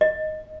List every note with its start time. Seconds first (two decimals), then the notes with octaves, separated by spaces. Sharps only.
0.01 D#5